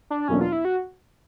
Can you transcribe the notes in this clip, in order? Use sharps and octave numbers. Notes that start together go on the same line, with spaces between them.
D4
E2 B2 F#3 A#3 C#4 D4
F4
E4
F#4